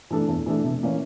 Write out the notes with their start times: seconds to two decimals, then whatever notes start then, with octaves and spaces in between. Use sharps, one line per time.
0.10 E3 A3 D4 A4
0.28 E2
0.46 E3 A3 D4 A4
0.64 F1
0.83 E3 A#3 C#4